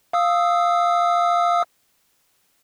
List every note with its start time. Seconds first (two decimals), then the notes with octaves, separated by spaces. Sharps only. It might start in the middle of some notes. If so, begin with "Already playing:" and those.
0.13 F5 D#6 E6